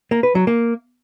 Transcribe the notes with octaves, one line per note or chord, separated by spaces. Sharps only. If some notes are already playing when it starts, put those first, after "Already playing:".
A#3
B4
F#3
A#3